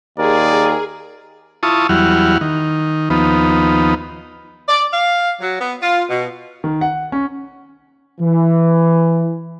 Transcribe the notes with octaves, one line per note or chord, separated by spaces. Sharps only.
D#2 G#4 A#4 D5
E4 F4 A5 C#6 D#6
E2 F#3 G3 E4 F#5 F6
D#3
D#2 F3 B3 D#4
D5
F5
F#3
B3
F4
B2
D#3
F#5
C#4
E3